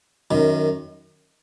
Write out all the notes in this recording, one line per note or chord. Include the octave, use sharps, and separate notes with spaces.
F#2 D#3